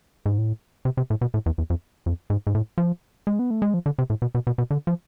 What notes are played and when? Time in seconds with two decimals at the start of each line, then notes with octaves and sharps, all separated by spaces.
0.26 G#2
0.38 A2
0.85 C3
0.97 C3
1.10 A2
1.21 B2
1.34 A2
1.46 E2
1.58 E2
1.70 F2
2.06 F2
2.30 G#2
2.47 G#2
2.55 A2
2.78 F3
3.27 G#3
3.39 B3
3.51 A3
3.62 G#3
3.74 F3
3.86 D3
3.99 C3
4.10 A2
4.22 B2
4.35 B2
4.47 B2
4.58 B2
4.71 D3
4.87 F3